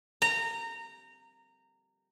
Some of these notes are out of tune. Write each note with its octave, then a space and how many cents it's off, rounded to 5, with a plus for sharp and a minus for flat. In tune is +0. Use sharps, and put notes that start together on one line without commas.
A#5 -20